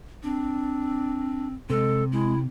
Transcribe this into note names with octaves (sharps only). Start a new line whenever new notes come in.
C4 D4
C3 G#3 A4
G#3 E4